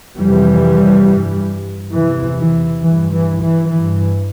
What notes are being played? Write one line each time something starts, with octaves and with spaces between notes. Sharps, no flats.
F2 C3 E3 G3
G2
E2 C3 E3
E3
G2 E3
E3
E3
G2 E3